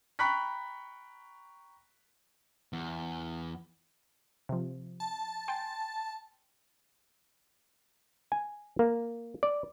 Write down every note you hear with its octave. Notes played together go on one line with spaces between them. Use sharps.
G5 A#5 B5 C#6 F#6 B6
E2
C3 F3
A5
G5 G#5 C6
G#5
A#3
D5